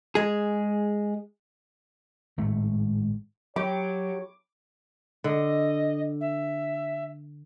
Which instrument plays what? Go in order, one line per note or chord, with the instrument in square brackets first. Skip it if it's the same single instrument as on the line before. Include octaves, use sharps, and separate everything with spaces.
[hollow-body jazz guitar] G#3 G#4
[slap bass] G#1 A2 G#3 A3
[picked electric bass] F#3 [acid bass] G4 [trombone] C#5 [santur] D6
[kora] D3 [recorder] D#5
[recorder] E5